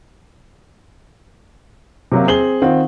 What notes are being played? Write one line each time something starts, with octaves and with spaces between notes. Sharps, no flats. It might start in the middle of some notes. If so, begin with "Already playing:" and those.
C3 F#3 A#3
C4 G#4 F#7 G7
D#3 C4 F4 F#5